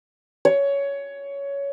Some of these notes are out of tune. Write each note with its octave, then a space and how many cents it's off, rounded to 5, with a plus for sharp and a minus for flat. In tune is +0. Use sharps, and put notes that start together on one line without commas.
C#5 +15